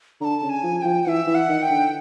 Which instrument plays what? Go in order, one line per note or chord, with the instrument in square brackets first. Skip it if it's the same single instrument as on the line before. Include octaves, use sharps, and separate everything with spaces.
[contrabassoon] D3 [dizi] A#5
[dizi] A5
[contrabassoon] C#3
[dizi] G#5
[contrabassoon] F3
[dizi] G#5
[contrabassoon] F3 [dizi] G5
[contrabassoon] E3 [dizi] E5 F#5
[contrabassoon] E3
[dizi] F#5
[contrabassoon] D#3
[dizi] G5
[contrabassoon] D3